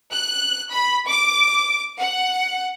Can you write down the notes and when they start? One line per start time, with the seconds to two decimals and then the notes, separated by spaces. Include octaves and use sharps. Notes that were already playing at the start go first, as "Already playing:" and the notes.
0.12 F#6
0.72 B5
1.07 D6
1.98 F#5